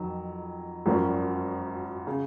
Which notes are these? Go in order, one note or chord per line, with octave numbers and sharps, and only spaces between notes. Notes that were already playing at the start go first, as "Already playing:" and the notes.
Already playing: F2 D#3 F#3
G#1 F#2 F3 A#3 C#4
C#3